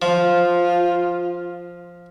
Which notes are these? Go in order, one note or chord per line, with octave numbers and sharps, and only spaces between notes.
F3 F4